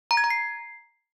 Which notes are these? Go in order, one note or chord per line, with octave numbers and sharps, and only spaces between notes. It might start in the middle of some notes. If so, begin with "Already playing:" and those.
A#5
G#6
A#5
C7